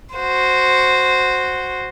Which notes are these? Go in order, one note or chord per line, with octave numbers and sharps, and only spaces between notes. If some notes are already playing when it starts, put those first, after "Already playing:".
F#4 C5